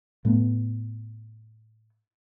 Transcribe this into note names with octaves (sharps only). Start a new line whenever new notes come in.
A2 A3 B3